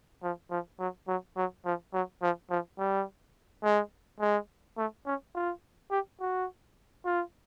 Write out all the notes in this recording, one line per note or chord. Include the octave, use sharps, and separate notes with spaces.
F3
F3
F#3
F#3
F#3
F3
F#3
F3
F3
G3
G#3
G#3
A3
C#4
F4
G4
F#4
F4